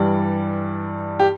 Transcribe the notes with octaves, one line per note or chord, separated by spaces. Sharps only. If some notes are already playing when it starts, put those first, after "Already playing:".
Already playing: G2 E3 G3 D5
G4